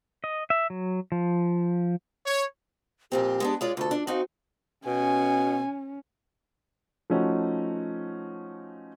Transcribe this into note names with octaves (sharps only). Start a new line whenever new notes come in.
D#5
E5
F#3
F3
C#5
F2 A#2 C4 G4
G#3 B3 D4
G#3 F4 C#5 D5
D2 F4 A4
D4
C4 D#4 F#4 F5
B2 C#4 G#5
F3 A3 C#4 D#4 F#4